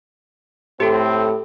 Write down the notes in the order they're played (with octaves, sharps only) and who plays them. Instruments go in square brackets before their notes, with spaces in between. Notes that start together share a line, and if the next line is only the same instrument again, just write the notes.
[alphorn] A2 [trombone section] C4 [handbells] G4 A4